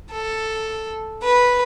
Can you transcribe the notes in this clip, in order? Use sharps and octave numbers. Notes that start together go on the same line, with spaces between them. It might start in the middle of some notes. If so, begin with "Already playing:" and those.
A4
B4